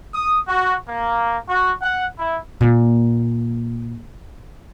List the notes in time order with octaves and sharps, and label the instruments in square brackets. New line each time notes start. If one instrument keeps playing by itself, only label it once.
[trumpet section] D#6
F#4
A#3
F#4
F#5
E4
[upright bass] A#2 A#3